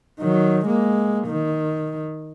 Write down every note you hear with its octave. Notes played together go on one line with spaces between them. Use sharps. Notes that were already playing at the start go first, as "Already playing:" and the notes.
D#3 F#3
G#3 A#3
D#3